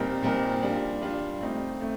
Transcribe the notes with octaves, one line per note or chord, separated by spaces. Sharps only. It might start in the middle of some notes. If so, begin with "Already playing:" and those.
Already playing: A#2 G3 C4 D#4 A#4
A#2 G3 C4 D#4 A#4
G3 D4 F4
G3 D4 F4
A3 C4 D#4
A3 C4